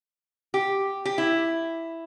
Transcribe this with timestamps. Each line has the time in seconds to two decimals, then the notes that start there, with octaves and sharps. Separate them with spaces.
0.54 G4
1.05 G4
1.18 E4